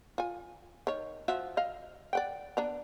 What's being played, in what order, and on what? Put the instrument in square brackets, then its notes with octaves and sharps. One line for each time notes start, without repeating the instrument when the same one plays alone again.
[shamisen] F4 G#5
D#3 C#5
F3 F#4 E5
D#5 F5
D5 F#5 G5
B3 D4 A#5